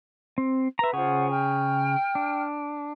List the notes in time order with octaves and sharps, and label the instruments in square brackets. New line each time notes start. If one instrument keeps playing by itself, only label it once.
[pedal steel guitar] C4
[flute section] B4 C6 [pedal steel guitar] E5 A#5
[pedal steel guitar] C#3 G#4 C#5 [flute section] F4 C5 F#5
[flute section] G5 F6
[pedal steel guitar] D4